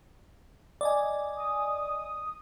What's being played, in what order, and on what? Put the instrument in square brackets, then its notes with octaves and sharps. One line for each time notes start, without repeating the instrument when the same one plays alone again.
[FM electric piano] D5 D#5 G#5
[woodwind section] D#6